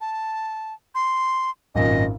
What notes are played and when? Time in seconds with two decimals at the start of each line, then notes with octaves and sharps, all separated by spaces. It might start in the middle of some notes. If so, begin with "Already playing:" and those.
0.01 A5
0.95 C6
1.75 G#1 F#2 A#2 D#5